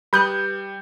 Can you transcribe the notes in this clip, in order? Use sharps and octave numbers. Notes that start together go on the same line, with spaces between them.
G3 B4 D#6 F#6 G6